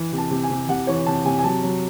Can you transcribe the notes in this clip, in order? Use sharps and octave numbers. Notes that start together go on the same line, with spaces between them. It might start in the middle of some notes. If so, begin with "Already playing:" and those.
Already playing: E3
C3
A5
C3
G#5
C3
C3 F#5
E3 C#5
C3 A5
C3 G#5
G#5
F#3 A5
F#3